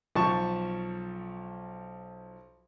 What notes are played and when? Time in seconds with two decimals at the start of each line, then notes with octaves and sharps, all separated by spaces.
0.16 B1 F3 A5 C#6